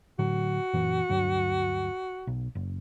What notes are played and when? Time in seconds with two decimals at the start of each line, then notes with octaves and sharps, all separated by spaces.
0.19 A2 D3 F#3 F#4
0.73 F#2 A#2 E3
1.09 D2 G2 F#3
2.27 B1
2.55 F#1